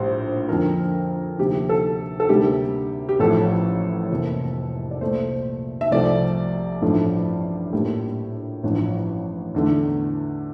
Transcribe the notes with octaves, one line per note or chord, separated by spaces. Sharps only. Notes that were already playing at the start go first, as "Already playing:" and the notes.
Already playing: A#1 A2 G3 A#3 C5
F2 D3 F3 A#3 A#4
D2 C3 F3 A#3 G4
A4
A4
D2 C3 G3 A#3 G4
G4
A1 A2 F3 A4
F1 F2 C3 E3 A#3
D5
C2 A#2 A3 C5
E5
C2 C3 F3 A3 D5
A1 G2 F3 A3
A#1 A2 G3 A#3
A1 G2 F3
E2 D3 A3